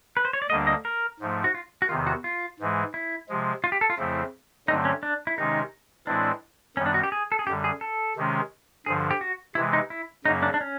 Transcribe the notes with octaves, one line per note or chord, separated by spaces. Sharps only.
B4
C5
C#5
D5
D2 D3 G3 A#3 D4 D#5
D#5
A#4
G#2 F3 A3
F#4
F4
F#4
E2 C3 D#3 F4
F#4
F4
G#2 E3 G#3
E4
C3 F3 G#3
F4
G4
A4
F4
F2 C#3 F3 A3 C4 E4
G2 D3 F#3 A3 C4 D#4
C#4
D4
E4
C3 D#3 G#3 C#4 D#4
A2 E3 G#3 C4 D4 E4
F#2 D#3 G3 B3 C#4
D4
F#4
G4
G#4
A4
G#4
F#2 D3 G3 G4
G#4
A4
C3 D#3 G#3 C#4
G2 D3 F3 G#4
G4
F#4
C3 E3 G#3 E4
D#4
E4
F#2 C#3 F#3 A#3 C#4 D#4
D4
D4
C#4